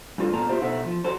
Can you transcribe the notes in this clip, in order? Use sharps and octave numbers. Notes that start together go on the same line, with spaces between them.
G2 F4 A4
A#2 A#3 B3 A4 A5 A#5
E4 F4 G4 C5 E5
B2 D#4 A4 E5 F#5
F3
F#3 A4 C5